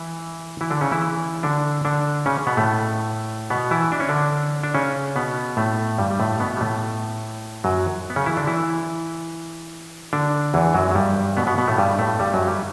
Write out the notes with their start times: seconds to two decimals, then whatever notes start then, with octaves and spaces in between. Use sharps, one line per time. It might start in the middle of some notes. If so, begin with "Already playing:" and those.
Already playing: E3 E4
0.61 E3 E4
0.71 D3 D4
0.81 C#3 C#4
0.92 E3 E4
1.43 D3 D4
1.85 D3 D4
2.26 C#3 C#4
2.47 B2 B3
2.57 A2 A3
3.50 B2 B3
3.71 E3 E4
3.92 D4
4.00 C#4
4.09 D3 D4
4.63 D4
4.74 C#3 C#4
5.16 B2 B3
5.57 A2 A3
5.98 G2 G3
6.10 G3
6.20 A2 A3
6.40 B2 B3
6.57 G3
6.61 A2 A3
7.64 F#2 F#3
8.10 B3
8.16 C#3 C#4
8.26 E3 E4
8.37 D3 D4
8.47 E3 E4
10.13 D3 D4
10.54 E2 E3
10.75 F#2 F#3
10.91 F#3
10.95 G2 G3
11.37 B2 B3
11.47 B2 B3
11.58 B2 B3
11.67 A2 A3
11.78 G2 G3
11.99 A2 A3
12.19 G2 G3
12.34 F#2 F#3
12.47 G3